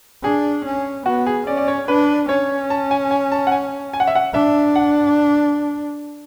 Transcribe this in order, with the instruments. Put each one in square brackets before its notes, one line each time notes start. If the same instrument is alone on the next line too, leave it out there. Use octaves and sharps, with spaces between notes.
[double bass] D4 [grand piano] G#4
[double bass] C#4
[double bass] B3 [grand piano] F#4
[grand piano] G#4
[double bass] C#4 [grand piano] D5
[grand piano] D5
C#5
[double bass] D4 [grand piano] B4
[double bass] C#4 [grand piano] C#5
[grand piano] A5
G#5
G#5
A5
F#5
G#5
G#5
F#5
E5
F#5
[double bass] D4 [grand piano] E5
[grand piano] F#5